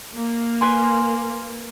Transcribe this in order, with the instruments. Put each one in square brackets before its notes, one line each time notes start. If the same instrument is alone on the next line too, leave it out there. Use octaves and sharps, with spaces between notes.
[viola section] A#3
[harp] B4 G#5 C6